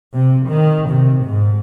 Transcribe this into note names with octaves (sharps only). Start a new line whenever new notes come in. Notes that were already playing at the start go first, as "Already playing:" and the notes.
C3
D#3
C3
G#2